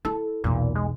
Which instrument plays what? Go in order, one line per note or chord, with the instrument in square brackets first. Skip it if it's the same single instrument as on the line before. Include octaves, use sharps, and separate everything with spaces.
[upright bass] E4 [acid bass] A4
[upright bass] B1 E2 [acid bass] A#2
[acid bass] G#3